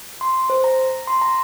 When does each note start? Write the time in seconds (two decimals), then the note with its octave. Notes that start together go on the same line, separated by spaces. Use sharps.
0.21 C6
0.50 C5
0.64 A#5
1.07 C6
1.22 A#5